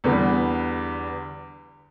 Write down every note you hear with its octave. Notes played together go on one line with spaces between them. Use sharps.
E2 D3 G3 B3